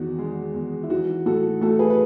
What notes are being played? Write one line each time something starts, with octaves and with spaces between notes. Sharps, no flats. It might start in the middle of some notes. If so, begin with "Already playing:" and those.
Already playing: E2 D#3 F#4
G#3
E2
E4
E3 D#4 F#4
A2 F#4 A4
A3 F#4 A4
G#4 B4
B4